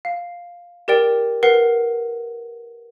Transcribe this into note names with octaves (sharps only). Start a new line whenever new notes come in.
F5
G4 A#4 D5 G5
A#4 B4 F#5 C7